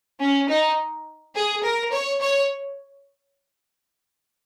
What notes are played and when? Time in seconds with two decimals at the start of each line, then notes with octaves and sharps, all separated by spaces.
0.20 C#4
0.49 D#4
1.35 G#4
1.63 A#4
1.92 C#5
2.20 C#5